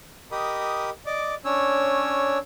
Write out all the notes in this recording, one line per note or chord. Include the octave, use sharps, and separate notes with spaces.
G4 A#4 D#5 B5 D#6
D5 D#5 D6
C#4 D4 C#5 E6